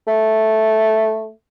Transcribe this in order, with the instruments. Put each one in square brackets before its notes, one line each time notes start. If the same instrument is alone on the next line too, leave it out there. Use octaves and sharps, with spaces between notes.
[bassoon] A3